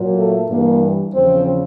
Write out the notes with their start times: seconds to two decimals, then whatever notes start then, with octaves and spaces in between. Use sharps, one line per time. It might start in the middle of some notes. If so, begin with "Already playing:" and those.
Already playing: A#2 F#3
0.17 A3
0.48 G2 E3 G3 A#3
1.14 E2 C#3 F3 C4